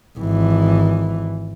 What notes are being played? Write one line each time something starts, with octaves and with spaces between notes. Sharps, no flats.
G#1 E3